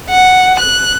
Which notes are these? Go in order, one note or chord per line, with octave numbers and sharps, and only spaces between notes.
F#5
F#6